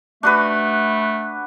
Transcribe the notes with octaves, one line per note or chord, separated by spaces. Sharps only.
A3 D4 F#4 B4